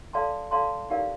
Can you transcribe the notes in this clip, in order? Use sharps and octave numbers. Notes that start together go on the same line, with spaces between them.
A4 D5 F5 A5 C6
A4 D5 F5 A5 C6
D#4 G4 A#4 D5 F5